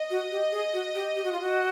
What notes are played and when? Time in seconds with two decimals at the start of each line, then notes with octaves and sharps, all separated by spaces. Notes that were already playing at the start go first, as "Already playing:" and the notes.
Already playing: D#5
0.10 F#4
0.31 G4
0.52 G#4
0.73 F#4
0.95 G4
1.15 G4
1.24 F#4
1.32 F4
1.41 F#4